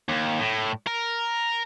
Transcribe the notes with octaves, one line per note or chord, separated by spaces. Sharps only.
D#2
A2
A#4